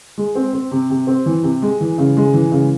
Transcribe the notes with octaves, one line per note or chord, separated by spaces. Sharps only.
G#3
C4
C4
C3
C3
C4
E3
C3
G#3
E3
C#3
G#3
E3
C#3